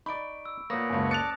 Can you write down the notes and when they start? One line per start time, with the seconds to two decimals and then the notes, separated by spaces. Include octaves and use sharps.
0.06 D#4 D5 B5 C#6 D7
0.46 E6
0.70 A#2 A#3 B3 C#5 D#6 A#6
0.90 F#1 C#2 G#5 A5
1.11 D5 A5 F#6 A6 C#7 F7